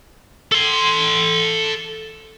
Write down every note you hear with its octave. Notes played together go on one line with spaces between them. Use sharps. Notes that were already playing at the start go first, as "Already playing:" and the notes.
A4 C6